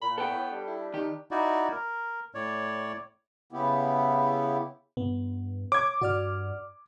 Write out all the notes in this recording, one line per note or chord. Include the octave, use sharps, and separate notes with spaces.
A#2 B5
B3 A4 G5
A2
G3 D4
E4
D#3 G4
D#4 E4 F#4 D5
A#4
A2 C#5 D5
C#3 B3 E4 G4
G2 B3
C#5 D6 G#6
G2 F#4 D5 F6